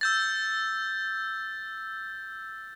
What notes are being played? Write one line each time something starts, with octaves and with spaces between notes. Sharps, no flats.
E6 G6 A6